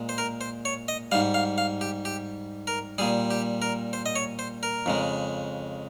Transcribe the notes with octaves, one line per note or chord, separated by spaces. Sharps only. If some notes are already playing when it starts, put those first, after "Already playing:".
Already playing: A#2 G#3
C5
A#4
C5
C#5
D#5
G#2 G3 F5
F5
F5
G4
G4
A#4
A#2 G3 G#4
G4
A#4
C5
D#5
C#5
C5
A#4
F2 C#3 G#3